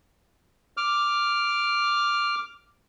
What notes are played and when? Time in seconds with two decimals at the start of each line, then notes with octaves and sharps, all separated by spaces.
0.77 D6 F6